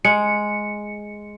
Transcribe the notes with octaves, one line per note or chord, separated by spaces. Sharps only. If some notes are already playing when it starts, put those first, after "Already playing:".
G#3 C#7